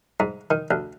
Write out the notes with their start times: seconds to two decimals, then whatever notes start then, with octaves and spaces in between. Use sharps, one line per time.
0.20 G#2
0.51 D#3
0.71 D2